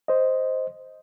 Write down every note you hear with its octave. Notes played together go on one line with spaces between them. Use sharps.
C5 D#5